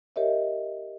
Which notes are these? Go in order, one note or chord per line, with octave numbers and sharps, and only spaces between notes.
G4 A#4 C#5 D#5 E5